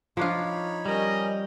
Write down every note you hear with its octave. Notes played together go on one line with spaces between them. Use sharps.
F3 D4 D#4 F4 C#5 B5
G3 C#4 A#4 D#5